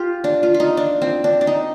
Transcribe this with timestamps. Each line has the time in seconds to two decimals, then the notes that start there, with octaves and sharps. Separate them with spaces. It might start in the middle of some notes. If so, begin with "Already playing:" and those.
Already playing: F4 G4
0.24 D4
0.43 F4
0.54 F4
0.60 D#4
0.77 D4
1.02 C4
1.24 D4
1.41 D4
1.47 D#4